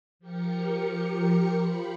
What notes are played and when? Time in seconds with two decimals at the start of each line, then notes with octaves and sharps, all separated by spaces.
0.19 F3 G4 A#4 C#7
1.57 F4 C5 B5